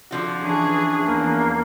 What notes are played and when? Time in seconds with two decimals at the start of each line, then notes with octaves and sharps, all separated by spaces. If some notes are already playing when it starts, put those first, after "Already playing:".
0.11 D3 F3 F#4
0.43 E3 C#4 D4 G#4
1.06 E2 A#3